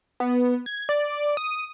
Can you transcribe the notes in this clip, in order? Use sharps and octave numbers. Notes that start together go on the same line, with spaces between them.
B3
G#6
D5
D#6